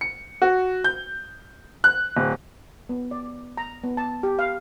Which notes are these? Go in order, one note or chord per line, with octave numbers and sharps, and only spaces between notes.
C#7
F#4
G6
F#6
D1
B3
D5
A#5
B3
A5
G4
F5